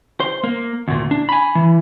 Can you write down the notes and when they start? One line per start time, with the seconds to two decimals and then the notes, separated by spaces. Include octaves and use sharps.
0.20 C5
0.44 A#3
0.88 D2 A#2
1.11 D4
1.29 G#5 B5
1.55 E3